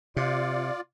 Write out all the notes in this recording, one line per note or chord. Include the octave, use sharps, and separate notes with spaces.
C3 F4 D5